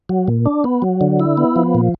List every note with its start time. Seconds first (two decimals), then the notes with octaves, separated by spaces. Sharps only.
0.09 F#3
0.28 A#2
0.46 D4
0.64 B3
0.82 F#3
1.01 D3
1.20 E4
1.37 B3
1.56 F3
1.75 A#2